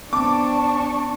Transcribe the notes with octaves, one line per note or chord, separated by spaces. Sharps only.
B3 C4 D4 A5 C#6 D6